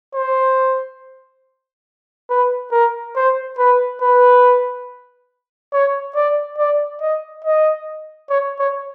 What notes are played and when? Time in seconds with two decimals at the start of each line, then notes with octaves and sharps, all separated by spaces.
0.15 C5
2.30 B4
2.72 A#4
3.16 C5
3.58 B4
4.01 B4
5.73 C#5
6.15 D5
6.58 D5
7.01 D#5
7.45 D#5
8.30 C#5
8.59 C#5